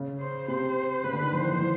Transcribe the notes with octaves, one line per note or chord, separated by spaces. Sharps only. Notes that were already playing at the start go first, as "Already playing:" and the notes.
Already playing: C#3
C5
C3 C5
C#3 B4
D3
D#3
F3 C5
E3
F3
E3